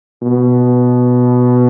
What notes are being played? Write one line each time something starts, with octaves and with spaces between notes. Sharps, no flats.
B2